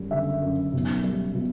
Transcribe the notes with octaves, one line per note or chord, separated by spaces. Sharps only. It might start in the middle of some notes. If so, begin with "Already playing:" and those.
Already playing: F#2 G3
D3 E5
F#2
B1
G3
B2